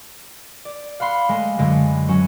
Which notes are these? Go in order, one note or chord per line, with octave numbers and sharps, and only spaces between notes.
D5
F5 F#5 B5 C6
G#3 A3 C6
F#2 D3 G#3
F#3 C#4